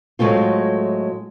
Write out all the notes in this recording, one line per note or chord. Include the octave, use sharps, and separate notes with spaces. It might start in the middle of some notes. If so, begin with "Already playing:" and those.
A2 F#3 G#3 A3 C4 F4